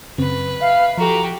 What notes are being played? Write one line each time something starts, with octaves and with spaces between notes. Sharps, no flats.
F#2 C#3 C4 B4
E5 F5
F3 F#4 G4 A4 A#5